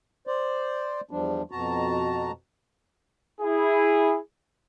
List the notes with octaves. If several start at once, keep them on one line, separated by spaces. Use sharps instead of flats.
C5 D5
E2 F3 G3 D4
F2 B2 F#4 A5 A#5
E4 G#4